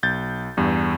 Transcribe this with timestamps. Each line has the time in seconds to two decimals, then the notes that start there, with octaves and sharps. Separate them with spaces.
0.03 B1 G6 A6
0.57 E2 G2